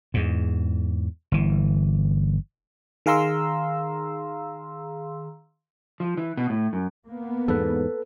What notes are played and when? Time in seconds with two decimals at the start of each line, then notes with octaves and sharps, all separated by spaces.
0.14 E2 G#2
1.32 G1 E3
3.06 D#3 G#4 F5 A#5 C6 E6
6.00 F3
6.17 E3
6.37 B2
6.50 A2
6.73 F#2
7.07 A#3 B3
7.48 E2 G#2 A4 B4